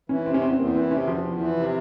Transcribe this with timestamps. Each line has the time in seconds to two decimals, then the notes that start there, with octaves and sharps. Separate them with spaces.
0.09 E3 C#4
0.26 C3 C4
0.34 C#4
0.42 E2 C4
0.58 E2 A#3
0.75 E3 C4
0.91 C3 C#4
1.07 E2 F3
1.24 E2
1.40 E3
1.56 C3